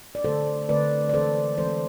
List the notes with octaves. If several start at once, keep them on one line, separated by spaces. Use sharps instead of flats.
D5
D3 A3 C4 A4 C5
D3 A3 C4 B4 D5
D5
E3 G#3 C4 A4 C5
E3 G#3 C4 A4 C5